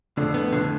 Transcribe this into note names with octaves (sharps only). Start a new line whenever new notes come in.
F2 A2 D3
B3
F2 A2 D3